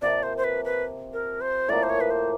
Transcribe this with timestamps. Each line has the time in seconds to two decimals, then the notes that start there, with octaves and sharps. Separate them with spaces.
0.02 C3 F3 A#3 D5
0.23 C5
0.37 C5
0.44 B4
0.65 B4
1.13 A#4
1.41 C5
1.68 A2 F3 A#3 D5
1.83 C5
1.90 C#5
2.01 B4
2.11 C5